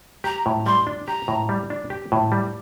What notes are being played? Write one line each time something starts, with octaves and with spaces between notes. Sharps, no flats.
G4 A#5
A2
G3 C6
D4
G4 A#5
A2
G3
D4
G4
A2
G3